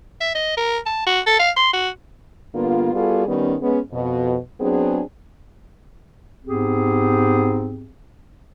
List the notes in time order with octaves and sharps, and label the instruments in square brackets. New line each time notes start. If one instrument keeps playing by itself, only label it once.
[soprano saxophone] E5
D#5
A#4
A5
F#4
A4
F5
C6
F#4
[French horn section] G2 D3 A#3 B3 F4
G3 B3 F4 F#4 G#4 A4
D#3 G3 B3 C#4
G#3 B3 C#4
F2 B2
F#3 B3 C4 D4 G#4
[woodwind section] G#2 B3 C4 G4 G#4